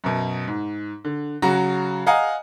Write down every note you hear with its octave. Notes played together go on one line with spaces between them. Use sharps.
F#2 B2
G#2
D3
C#3 F#3 F#4 A#5
D#5 F5 F#5 G#5 A#5 D#6